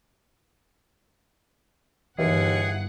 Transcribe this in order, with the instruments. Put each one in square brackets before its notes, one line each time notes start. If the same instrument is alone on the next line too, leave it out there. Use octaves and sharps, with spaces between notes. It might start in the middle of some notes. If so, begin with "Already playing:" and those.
[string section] G1 F#5 [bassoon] D#2 [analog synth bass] E3 [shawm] G#4